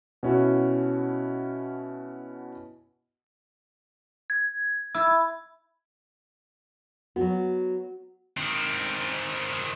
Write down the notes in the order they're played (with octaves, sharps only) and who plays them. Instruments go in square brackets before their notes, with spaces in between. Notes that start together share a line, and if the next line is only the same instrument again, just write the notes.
[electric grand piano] B2 C#4 E4 F#4
[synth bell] G#6
[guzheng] E4 [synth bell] E6 G#6
[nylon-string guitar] F#3 B3 [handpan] F#4
[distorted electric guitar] D#3 C4